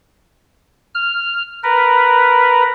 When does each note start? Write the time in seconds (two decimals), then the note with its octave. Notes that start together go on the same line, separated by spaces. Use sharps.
0.95 F6
1.63 A#4 B4